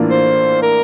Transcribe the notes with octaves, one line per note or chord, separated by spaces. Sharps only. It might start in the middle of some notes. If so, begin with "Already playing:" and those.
Already playing: A2 E3 A#3 D4 F4
C5
A#4